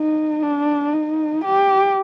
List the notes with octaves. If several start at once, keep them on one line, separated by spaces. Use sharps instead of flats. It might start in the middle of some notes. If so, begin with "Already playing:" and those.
Already playing: D#4
D4
D#4
G4